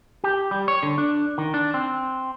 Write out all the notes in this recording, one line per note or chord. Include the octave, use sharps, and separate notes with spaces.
G4
G3
C#5
D3
D4
D#3
D4
C4